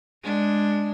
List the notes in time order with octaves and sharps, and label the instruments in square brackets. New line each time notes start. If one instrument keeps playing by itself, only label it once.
[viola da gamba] G#3 D4